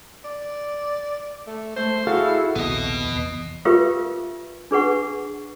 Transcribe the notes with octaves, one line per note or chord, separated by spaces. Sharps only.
D5
A3
A3 C5
E4 F#4 G#4 A4 F5
A#1 D#2 C3 B3 D#5
F1 E2
F4 G4 A#4 B4 E5 F5
D4 G#4 B4 F#5 C#6